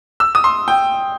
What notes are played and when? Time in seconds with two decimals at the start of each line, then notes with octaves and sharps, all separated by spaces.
0.20 E6
0.35 D#6
0.44 C6
0.68 G5